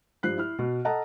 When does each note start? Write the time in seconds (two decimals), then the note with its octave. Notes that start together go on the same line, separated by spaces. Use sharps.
0.23 G2 F3 F#6 C7
0.37 E4 F6
0.59 B2
0.85 A4 D#5 F#5 A5 A#5